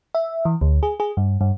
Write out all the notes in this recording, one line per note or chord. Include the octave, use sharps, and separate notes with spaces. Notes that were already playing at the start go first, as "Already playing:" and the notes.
E5
E3
D2
G#4
G#4
G2
G2